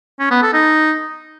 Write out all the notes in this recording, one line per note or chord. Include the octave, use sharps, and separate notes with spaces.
C#4
B3
A4
D#4